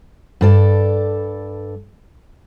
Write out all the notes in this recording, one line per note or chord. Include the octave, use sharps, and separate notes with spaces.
G2 A4 D5